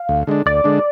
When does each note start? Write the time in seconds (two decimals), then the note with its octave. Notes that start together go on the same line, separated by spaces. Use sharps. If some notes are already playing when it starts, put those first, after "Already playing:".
Already playing: F5
0.09 D2
0.27 D3 G#3 D4
0.46 D2 D5
0.64 D3 G#3 D4